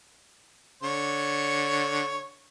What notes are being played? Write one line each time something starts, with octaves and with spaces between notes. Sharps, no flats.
D3 C#5 C#6